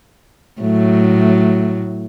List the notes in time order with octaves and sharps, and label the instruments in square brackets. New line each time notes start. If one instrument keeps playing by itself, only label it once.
[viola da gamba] A2 F#3 A3